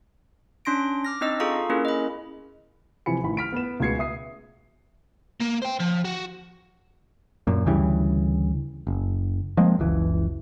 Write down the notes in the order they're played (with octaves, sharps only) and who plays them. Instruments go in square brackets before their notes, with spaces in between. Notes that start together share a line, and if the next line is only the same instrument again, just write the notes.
[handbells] C#4 D4 C6 A#6 D7
D6 F6 A#6
C4 D4 D#4 D#5 E6
F4 G#4 A4 F5 A#5 C#6
A#3 C#4 E4 G#4 A#4
D#5 B5
[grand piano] C3 E3 F3 G#5 B5 C#7
A1 D#3 B5
F6 B6 D7
B3 B4 E7
C#2 B2 G#3 G#6 C7 C#7
E5 D#6 C7
[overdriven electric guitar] A#3
C5 G5
F3
F#4
[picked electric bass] F#2 A#2
D2 C#3 E3 G3
F#1
F3 G#3 A#3 C4
F#1 C#2 E3